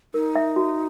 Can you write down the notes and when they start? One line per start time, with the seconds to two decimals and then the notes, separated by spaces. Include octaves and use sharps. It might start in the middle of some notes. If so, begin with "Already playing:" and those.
0.14 D#4 A#4
0.36 E5
0.56 F#4